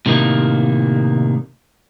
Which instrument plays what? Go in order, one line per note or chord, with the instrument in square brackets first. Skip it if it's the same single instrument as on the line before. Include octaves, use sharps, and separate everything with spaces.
[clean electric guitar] A2 C3 D#3 G#3 A#3